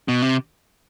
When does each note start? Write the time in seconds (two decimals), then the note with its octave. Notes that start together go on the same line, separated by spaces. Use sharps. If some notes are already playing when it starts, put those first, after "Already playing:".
0.08 B2
0.22 C3